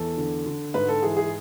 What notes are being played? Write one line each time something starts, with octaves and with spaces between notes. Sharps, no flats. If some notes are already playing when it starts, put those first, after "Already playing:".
Already playing: E2 A4
D3
D3
G#2 B4
A4
E3 G#4
G#4